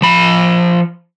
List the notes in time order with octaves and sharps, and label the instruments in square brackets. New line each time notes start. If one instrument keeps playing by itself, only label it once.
[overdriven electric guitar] F3 B5